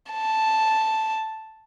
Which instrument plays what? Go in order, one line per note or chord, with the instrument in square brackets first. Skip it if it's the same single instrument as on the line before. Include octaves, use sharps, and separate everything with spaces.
[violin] A5